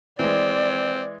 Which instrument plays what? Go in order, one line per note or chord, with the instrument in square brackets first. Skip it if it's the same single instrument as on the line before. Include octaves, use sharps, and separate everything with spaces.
[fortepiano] E3 G#3 [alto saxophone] C4 [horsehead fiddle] D5